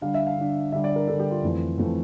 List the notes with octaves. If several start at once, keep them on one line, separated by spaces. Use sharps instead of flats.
D3 G3 D4 F5
E5
F5
D3 G3 D4
D3 G3 D4 E5
D5
A#4
D3 G3 D4 A4
G4
F4
F2 E3 A3
F2 E3 A3